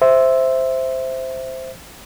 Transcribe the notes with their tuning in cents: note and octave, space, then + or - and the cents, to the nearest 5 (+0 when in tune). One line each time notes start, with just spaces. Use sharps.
C5 +0 E5 +0